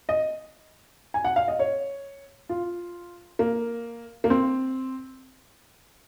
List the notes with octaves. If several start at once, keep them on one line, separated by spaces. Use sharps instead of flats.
D#5
G#5
F#5
F5
D#5
C#5
F4
A#3
A#3
C4